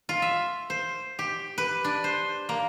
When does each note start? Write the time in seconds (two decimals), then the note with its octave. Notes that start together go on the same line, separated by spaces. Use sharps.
0.09 F4
0.22 E5
0.70 C5
1.19 G4
1.58 B4
1.84 D4
2.04 C5
2.49 A#3